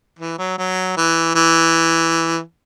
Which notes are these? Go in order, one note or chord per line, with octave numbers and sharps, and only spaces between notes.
E3
F#3
F#3
E3
E3